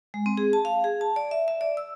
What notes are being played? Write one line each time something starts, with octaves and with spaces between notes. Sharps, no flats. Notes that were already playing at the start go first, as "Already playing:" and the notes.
G#3
C4
G#4
A5
F5
G#4
A5
D5
E5
E5
D5
E6